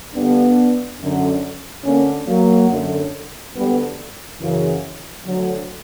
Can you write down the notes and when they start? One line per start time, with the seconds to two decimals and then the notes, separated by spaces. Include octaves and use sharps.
0.14 G2 D3 B3 D4
1.00 F#2 D3
1.84 D2 D3 A#3 C#4
2.27 F#3 A#3
2.69 F#2 D3
3.54 D2 D3 G3 B3
4.40 F#2 C#3 E3
5.25 D2 D3 F#3